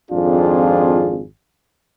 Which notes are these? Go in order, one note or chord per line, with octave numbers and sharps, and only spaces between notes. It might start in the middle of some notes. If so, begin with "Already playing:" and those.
G#1 F2 D4 F4 G#4